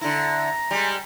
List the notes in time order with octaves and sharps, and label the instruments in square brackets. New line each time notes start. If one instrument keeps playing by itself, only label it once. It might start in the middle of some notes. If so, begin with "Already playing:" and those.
[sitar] D3 E4 [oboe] A#5
[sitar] G3 G#3